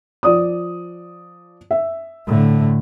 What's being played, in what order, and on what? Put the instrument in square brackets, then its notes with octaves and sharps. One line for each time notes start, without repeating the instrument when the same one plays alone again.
[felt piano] F3 D5 D#6
E5
[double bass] A2 D3